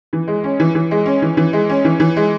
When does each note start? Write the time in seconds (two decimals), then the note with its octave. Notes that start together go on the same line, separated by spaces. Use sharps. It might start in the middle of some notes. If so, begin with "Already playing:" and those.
0.13 E3
0.28 G#3
0.44 C#4
0.60 E3
0.75 E3
0.91 G#3
1.06 C#4
1.22 E3
1.37 E3
1.53 G#3
1.69 C#4
1.85 E3
2.00 E3
2.16 G#3